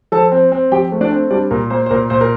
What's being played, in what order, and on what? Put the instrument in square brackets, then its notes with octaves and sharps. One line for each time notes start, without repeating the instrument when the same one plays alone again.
[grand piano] F3 A4 A5
C4
C4
F3 G4 G5
A3
D4 D5
C4
G3 D4 D5
A#2 A#4
A#3 C5
C5
A#2 A#4
A#2 C5
A#4